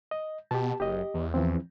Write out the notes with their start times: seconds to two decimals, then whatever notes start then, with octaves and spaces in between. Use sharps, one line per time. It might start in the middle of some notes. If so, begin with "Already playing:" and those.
0.11 D#5
0.51 B2 G4 A5
0.80 F#1 G4 D#5
1.14 E2
1.34 E2 E3 F3 C4